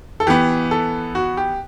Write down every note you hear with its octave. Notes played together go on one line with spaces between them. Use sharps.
A4
E3 B3 G4
A4
F#4
G4